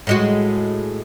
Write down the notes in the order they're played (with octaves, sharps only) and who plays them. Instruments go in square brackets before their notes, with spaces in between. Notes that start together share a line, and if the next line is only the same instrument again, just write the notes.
[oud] A2 G#3 F#4